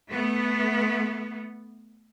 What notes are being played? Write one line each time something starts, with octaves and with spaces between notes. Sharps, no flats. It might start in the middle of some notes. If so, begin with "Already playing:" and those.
A3 B3